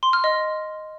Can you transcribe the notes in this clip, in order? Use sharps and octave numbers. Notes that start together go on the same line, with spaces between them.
C6
F6
D#5